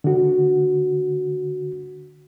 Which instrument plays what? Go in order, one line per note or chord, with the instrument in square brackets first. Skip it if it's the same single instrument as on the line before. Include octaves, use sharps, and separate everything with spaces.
[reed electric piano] D3 F#4